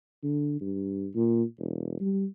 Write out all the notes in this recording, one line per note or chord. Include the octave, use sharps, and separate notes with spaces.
D3
G2
A#2
E1
G3